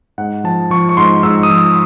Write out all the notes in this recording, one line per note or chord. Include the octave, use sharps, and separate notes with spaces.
G#2 F#5
F3 A5
F3 C#6
C#6
G#2 C6
G#2 E6
D#6
F3 E6